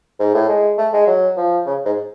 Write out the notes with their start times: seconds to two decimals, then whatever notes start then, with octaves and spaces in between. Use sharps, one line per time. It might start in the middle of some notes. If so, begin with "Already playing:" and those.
0.20 G#2
0.34 A2
0.49 G#3
0.78 A3
0.93 G#3
1.07 F#3
1.37 F3
1.66 C#3
1.86 G#2